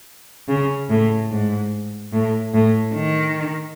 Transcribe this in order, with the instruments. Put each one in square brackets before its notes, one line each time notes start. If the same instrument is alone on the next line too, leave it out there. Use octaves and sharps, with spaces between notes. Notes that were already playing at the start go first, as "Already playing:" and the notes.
[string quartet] C#3
A2
G#2
A2
A2
D#3